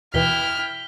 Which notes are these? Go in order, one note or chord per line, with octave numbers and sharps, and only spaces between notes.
D#2 B2 E3 E4 G5 F6 B6 G7